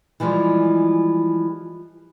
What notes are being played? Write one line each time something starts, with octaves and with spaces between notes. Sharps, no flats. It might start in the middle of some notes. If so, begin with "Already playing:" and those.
E3 F3 G3 G#3